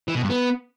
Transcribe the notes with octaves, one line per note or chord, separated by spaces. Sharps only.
E3
B2
G2
B3